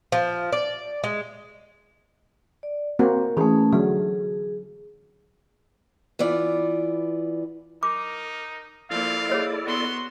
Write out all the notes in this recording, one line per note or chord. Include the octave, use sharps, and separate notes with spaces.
F3
D5
G#3
D5
A#3 C4 F#4 A#4
E3 A3 C#4 G#4
D3 F#3 G#4
E3 B3 F4 D5
D#4 A#4 D6
F3 A#3 E4 A4 D5 F5
A#3 G#4 C#5 D#5
B3 F#4 C6